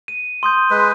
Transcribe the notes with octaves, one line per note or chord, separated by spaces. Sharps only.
D#7
C6 D#6 G6
G#3 B4